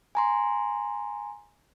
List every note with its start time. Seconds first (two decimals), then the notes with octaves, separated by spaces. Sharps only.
0.15 G#5 A#5 C6